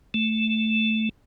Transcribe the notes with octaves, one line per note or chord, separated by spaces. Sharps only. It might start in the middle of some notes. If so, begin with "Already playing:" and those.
A3